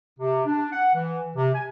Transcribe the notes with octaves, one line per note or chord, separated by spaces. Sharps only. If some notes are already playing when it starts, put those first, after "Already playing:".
C3
D4
F#5
E3
C3
G#5